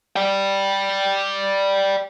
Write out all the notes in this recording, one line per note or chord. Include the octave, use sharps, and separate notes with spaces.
D5 G5